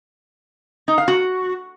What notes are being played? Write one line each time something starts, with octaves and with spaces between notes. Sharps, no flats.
D#4
F5
F#4